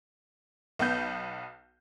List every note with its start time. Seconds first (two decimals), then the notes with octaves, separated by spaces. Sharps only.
0.79 B1 B3 G6